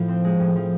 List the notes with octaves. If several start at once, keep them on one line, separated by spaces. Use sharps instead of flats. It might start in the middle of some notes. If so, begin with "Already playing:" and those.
Already playing: A2 F3
C4
G#3
A2
F3